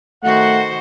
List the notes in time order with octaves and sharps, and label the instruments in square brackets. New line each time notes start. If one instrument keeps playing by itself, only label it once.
[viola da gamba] D#3 F#4 C5 [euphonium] A3 [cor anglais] F#5